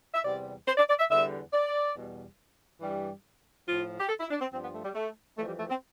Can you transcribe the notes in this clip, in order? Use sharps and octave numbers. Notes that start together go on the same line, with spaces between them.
E5
E2 C3 G3 D5
C5
D5
D5
E5
E2 D3 G3 E5
D5
E2 B2 G3
G2 E3 G3
A2 F3 F4
G4
A4
E4
D4
C4
G2 F3 C4
B3
A3
G3
A3
F2 E3 G3 A3
G3
A3
C4